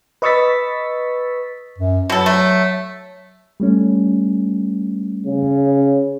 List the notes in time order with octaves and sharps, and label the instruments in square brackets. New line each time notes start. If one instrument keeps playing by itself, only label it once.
[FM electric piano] B4 D#5 C#6 E6 A6 B6
[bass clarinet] F#2
[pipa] B2 A4 [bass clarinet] F#3
[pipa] A3
[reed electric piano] G3 A3 C#4
[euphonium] C#3